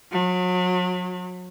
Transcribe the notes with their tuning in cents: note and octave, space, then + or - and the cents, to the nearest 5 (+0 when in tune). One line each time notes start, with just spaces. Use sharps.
F#3 -35